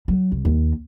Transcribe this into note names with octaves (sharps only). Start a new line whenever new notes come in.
F#3
C2
D#2